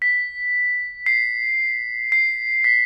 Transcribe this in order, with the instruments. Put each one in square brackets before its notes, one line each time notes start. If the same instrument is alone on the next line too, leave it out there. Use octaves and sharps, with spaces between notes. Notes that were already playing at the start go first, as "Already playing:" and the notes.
[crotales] B6
C7
C7
B6